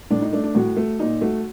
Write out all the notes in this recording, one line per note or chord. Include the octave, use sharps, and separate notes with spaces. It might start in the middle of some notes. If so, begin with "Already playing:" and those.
A2 D4
D#4
A3 D4
D4
A2 F#4
A3
A#2 D#4
A3 F#4